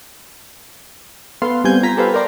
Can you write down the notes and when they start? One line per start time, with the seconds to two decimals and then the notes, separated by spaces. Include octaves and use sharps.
1.42 B3 A4 F5 C6
1.64 G3 B3 C4 G#5 G6 G#6
1.83 F4 A#5 B6
1.97 G4 A4 B4 C5 F5
2.14 A#4 C5 D5 A#5